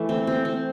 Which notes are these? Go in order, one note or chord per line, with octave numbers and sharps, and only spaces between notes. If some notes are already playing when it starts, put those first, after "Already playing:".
Already playing: E3 A3 E4
C4
C4
C4